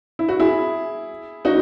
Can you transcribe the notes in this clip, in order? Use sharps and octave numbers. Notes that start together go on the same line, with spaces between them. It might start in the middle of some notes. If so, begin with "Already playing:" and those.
E4
F#4
E4 G#4
D#4 F#4